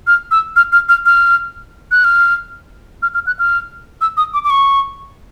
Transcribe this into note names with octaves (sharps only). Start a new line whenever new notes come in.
F6
E6
F6
F6
F6
F6
F#6
F6
F6
F6
F#6
F6
E6
D#6
D6
D6
C#6